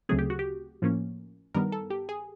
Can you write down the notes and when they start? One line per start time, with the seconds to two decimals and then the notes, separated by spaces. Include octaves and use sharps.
0.09 D2 C#3 F#3 A3 C4 G#4
0.19 G4
0.30 F#4
0.39 G4
0.82 A2 F3 A#3 C#4
1.54 G2 D#3 G3 B3 A#4
1.72 A4
1.90 G4
2.09 G#4